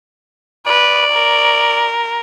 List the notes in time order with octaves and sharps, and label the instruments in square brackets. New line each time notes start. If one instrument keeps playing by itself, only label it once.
[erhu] B4 [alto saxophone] D5
[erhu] A#4